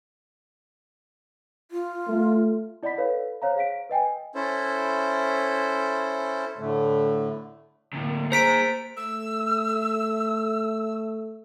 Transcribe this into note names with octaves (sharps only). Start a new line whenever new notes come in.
F4
A3
E4 D5 D#5 F#5 B5 B6
A4 B4 C#5 F5
C5 C#5 F5 A#5
G#4 C#5 F5 B6 D7
B4 D#5 G5 G#5
C#4 E4 A4 C5
A2 D3 A3
D2 A2 A#3
G#4 C5 A#5 B6 D7
A3 E6